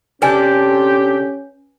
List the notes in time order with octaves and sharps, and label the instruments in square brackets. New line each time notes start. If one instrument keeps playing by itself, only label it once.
[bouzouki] C3 D4 A4 [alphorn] C#4 [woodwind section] G4 [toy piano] B4 G#5